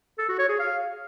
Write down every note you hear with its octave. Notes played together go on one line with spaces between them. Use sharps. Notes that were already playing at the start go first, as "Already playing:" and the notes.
A4
F#4
C#5
G#4
F5